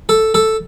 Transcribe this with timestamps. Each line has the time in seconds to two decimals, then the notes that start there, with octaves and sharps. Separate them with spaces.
0.09 A4
0.34 A4